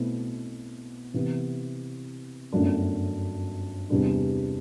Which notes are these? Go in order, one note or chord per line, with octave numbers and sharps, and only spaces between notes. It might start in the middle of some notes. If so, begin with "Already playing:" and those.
Already playing: B1 B2 A3 C4 E4
C3 E3 B3
G1 F#2 F#3 A3 D4
E2 C3 G3 D4